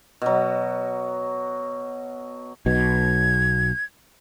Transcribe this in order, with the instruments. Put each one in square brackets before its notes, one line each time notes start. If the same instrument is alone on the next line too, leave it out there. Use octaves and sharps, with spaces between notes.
[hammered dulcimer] B2 F#3
[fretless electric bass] B1 B2 [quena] G#6